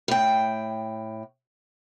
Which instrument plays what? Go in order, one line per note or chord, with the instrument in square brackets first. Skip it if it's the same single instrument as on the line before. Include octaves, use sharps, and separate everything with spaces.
[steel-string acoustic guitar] A2 G5